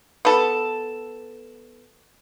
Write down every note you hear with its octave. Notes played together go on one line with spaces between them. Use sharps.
B3 A4